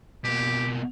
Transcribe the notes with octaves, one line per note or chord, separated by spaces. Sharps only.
B2 A#3 G4